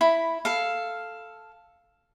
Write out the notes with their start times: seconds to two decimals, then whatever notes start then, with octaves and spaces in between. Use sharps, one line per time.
0.01 E4 B5
0.45 A4 F5